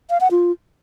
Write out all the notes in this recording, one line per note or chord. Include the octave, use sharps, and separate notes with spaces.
F5
F#5
F4